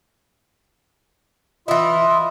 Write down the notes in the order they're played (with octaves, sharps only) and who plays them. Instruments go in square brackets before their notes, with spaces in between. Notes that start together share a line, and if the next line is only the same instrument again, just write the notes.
[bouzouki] E3 E4 [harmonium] F4 D#5 E5